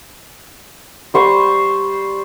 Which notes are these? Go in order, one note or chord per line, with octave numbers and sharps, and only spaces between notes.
G3 C5 C#6